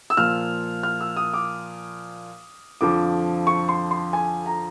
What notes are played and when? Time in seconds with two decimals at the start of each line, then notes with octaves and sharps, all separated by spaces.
0.10 E6
0.17 A#2 F3 F6
0.83 F6
1.01 E6
1.17 D#6
1.34 D6
2.81 F2 D3 F3 D6
3.47 C#6
3.69 C6
3.91 C6
4.13 G#5
4.46 A#5